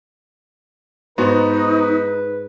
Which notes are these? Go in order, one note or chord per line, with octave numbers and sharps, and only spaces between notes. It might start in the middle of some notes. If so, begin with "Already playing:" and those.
G#2 B3 D#4 F#4 B4 C5